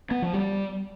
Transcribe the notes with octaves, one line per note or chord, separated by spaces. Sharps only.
B3
F3
G3